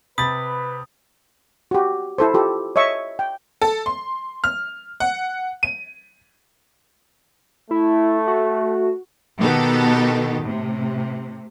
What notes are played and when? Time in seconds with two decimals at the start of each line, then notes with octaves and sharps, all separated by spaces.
0.18 C3 B4 B5 D#6 A6
1.71 F#4 G4
2.18 E4 A4 C5
2.34 F4 G4 A4
2.76 C#5 D#5 E5 C#6
3.19 G5
3.62 A4
3.86 C6
4.44 F6
5.00 F#5
5.63 D#7
7.71 A3 E4
8.28 F#4
9.37 B2 D#3 B3 D#4 G4 A4
10.43 A2 C3